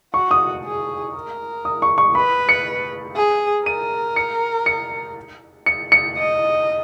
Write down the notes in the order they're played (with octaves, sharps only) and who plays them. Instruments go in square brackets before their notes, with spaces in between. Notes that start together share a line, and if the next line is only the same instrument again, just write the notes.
[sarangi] F#4 [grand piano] C#6
[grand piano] D#6
[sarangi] G#4
A#4
[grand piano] D#6
C#6
C#6
[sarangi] B4 [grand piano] B5
[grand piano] C#7
[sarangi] G#4
[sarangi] A#4 [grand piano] D#7
[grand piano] C#7
C#7
C#7
C#7
[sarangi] D#5